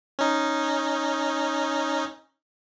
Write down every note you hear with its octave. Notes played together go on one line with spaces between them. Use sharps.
C#4 D#4